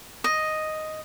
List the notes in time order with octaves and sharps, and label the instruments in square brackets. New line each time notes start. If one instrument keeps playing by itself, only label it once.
[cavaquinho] D#5